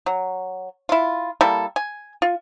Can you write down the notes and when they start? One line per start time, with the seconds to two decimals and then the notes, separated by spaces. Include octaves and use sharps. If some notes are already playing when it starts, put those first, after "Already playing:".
0.06 F#3
0.89 E4 F4
1.41 G3 A#3 E4 A4
1.76 G#5
2.22 F4